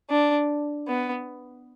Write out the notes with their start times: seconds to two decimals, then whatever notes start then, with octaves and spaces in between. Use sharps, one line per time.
0.10 D4
0.87 B3